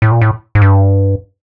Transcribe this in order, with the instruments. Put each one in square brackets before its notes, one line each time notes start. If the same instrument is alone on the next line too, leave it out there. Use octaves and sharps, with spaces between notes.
[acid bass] A2
A#2
A2
G#2
G2